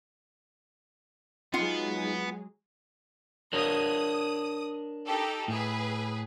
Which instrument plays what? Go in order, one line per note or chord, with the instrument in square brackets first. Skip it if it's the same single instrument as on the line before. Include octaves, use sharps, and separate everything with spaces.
[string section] F#3 G#3 G#4 [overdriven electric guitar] B3 [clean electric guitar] D#4 [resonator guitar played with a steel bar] F4 F#5
[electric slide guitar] D4 A#4 C#5 [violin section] D#6
[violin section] D#4 G4 A4
[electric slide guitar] A2 [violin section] G#4 B4